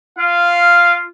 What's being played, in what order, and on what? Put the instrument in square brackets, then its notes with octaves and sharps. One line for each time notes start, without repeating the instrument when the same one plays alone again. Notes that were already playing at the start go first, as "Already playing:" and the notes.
[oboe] F4 [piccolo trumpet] F5